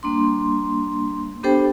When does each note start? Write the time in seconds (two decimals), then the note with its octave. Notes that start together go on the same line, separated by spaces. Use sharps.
0.03 G3 A#3 D4 C6
1.43 B3 D4 G4 A4 C5 G5